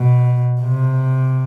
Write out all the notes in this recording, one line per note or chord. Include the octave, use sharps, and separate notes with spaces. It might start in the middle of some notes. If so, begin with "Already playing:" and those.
Already playing: B2
C3